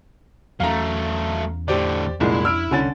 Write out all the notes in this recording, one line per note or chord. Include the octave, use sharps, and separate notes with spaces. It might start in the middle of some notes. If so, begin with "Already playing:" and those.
E2 F#3 A3 C#4 F5 A#5
A2 D3 G4 C5 D5
C2 F2 A#2 G#3 C#4 D4 E4 B5
E6 F6 D7
C2 D3 C#4 A6